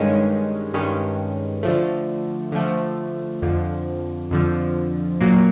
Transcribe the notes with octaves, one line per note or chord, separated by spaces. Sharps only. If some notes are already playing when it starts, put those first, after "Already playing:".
Already playing: G2 D#3 G#3 C#4
G2 D#3 G#3 C#4
D3 F3 A3
D3 F3 A3
F2 D3 F3
F2 D3 F3
A#2 F#3 A#3